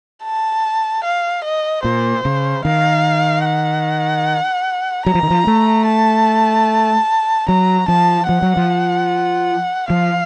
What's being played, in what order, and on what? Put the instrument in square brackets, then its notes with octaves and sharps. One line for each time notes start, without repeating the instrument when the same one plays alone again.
[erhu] A5
F5
D#5
[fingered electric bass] A#2 [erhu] C5
[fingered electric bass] C#3
[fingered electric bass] D#3 [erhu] F5
[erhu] F#5
[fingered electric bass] F#3 [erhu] A#5
[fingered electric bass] F3
D#3
F3
A3
[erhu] A5
[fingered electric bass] F#3 [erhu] A#5
[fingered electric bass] F3 [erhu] A5
[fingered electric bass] F3 [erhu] F#5
[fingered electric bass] F#3
F3
[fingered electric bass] F3 [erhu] F5